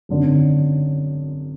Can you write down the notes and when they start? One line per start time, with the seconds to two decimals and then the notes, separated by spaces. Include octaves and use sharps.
0.09 G#1 F#2 D3